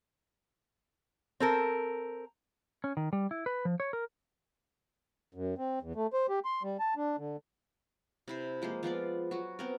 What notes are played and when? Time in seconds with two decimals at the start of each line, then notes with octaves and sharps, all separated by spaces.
1.40 C4 A4 A#4
2.84 C#4
2.97 D#3
3.13 G3
3.31 E4
3.46 B4
3.65 F3
3.80 C#5
3.93 A#4
5.35 F#2
5.58 C4
5.82 E2
5.95 A3
6.13 C5
6.29 G4
6.45 C6
6.63 G3
6.80 A5
6.97 D4
7.18 D3
8.28 C3 E4 C5
8.62 F3 G#3 A#3 C5
8.83 F3 B3 F4 D5
9.31 F#3 F#4
9.59 B3 C4 A#4